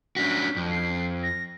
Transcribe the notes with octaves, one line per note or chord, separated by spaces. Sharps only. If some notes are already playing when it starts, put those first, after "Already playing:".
C#4 D4 F#4 B6
F2
C7
A#6